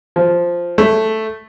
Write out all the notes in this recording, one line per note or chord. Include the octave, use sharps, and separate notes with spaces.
F3
A3